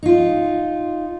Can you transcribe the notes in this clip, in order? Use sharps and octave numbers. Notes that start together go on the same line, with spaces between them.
D#4 F4